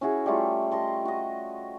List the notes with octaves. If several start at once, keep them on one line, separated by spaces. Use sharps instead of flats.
C#4 E4 F#4 G#4
G3 A3 F4
D#5 A5 C6
F#4 D#5